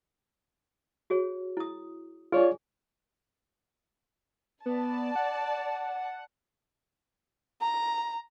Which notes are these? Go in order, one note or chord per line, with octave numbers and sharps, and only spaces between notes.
F#4 G#4 C#5
E4 D#6
D4 F4 G#4 C#5 D5
B3 D5 A5
F#5
A#5